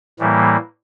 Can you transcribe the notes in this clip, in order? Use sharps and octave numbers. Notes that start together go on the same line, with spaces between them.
A2 E3 G3 A#3